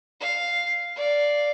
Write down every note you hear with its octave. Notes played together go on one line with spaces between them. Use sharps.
F5
D5 F5